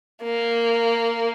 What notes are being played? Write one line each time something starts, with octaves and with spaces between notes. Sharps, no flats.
A#3